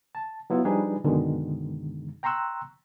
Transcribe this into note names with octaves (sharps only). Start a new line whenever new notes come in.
A5
F#3 B3 E4 F4
F3 G3 D4 D#4 G#4 B4
F#2 B2 D3 D#3 G#3
G5 A#5 C6 C#6 E6 F#6